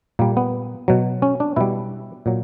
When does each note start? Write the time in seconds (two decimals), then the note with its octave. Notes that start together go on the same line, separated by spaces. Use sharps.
0.19 A#2 G3 A#3
0.37 B3
0.88 B2 F#3
1.22 C#4
1.40 D4
1.56 B2 G3 E4
2.26 A#2 F#3